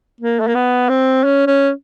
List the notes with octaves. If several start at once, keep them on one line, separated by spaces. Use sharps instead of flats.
A#3
A3
A#3
B3
C4
C#4
C#4